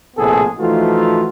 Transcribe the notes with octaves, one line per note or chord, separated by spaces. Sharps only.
A#1 A2 C3 B3 G#4 A4
E3 F3 A3 D#4 F4 F#4